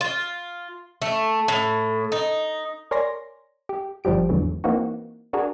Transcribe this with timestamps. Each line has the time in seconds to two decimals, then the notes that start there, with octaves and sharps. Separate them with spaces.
0.01 F4
1.02 A3
1.48 A2
2.12 D#4
2.91 A#4 C#5 D5 G#5 C6 A#6
3.69 G4
4.04 G1 F3 G3 G4 D7
4.29 E2 G#2 D3 E3 F#3
4.64 E3 A#3 C4 D#4 F#4
5.33 D4 F#4 G#4 A#4